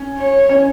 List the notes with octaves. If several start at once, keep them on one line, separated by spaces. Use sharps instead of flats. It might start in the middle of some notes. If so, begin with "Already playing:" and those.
Already playing: C#4
C#5
C#4